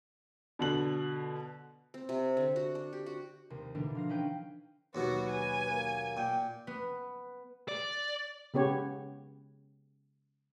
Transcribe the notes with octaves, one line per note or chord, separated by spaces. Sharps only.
B2 D3 F#7
C4
C3
D3
F#4
D4
G4
F#4
D#2 C3
B2 D3 E3 B3 D4 D#4
F3 F5 A#6
C#4 D#4 B4 G5
D#2 B2 F#3 F#4 B4
G#5
A#3
A#2 G5
B3
D5
C#3 B3 G4 C#5